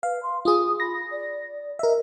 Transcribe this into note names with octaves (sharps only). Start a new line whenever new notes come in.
B4 F5
C6
F4 G#4 D#6
B5 A#6
D5
A#4 D#5 E5